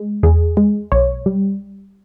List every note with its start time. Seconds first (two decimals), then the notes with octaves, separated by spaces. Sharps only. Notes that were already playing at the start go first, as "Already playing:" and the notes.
Already playing: G#3
0.23 E2 G#4
0.57 G#3
0.92 B1 C#5
1.26 G3